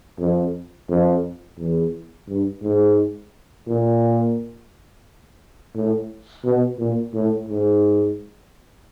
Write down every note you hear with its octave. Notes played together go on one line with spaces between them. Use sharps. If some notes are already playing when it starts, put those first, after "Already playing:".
F2
F2
E2
G2
G#2
A#2
A2
B2
A#2
A2
G#2